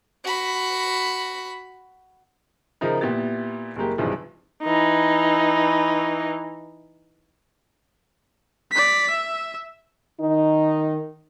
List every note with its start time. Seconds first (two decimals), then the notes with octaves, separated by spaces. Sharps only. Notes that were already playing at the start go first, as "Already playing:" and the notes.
0.25 F#4 B5
2.81 C#3 F3 D#4 E4 A#4
3.01 A#2 B3 E4 G4 A6
3.76 F#1 G#3 A#3 G4
3.98 B1 G2 C3 E3 F3 G#3
4.63 E3 D#4
8.72 D5 B6
9.10 E5
10.21 D#3 D#4